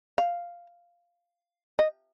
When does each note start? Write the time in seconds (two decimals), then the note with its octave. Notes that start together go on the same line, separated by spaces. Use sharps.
0.18 F5
1.79 D#5